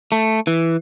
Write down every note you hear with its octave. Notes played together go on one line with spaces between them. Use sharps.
A3
E3